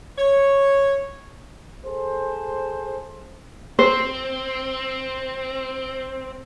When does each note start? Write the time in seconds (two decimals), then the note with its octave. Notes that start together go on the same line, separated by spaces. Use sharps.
0.18 C#5
1.87 G#4 A4 C5
3.79 C4 C5